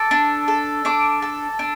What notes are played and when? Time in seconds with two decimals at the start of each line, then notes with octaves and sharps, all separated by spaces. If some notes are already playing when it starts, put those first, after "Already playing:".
Already playing: A4 D6
0.11 D4
0.48 A4
0.85 D4 D6
1.22 A4
1.59 D4